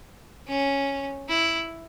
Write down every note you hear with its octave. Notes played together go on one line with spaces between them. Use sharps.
C#4
E4